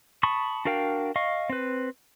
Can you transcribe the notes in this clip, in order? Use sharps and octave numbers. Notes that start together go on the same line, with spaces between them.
A5 B5 C#6 D#6
D4 F#4 A#4 F5 G5
D#5 F5 C#6
C4 B4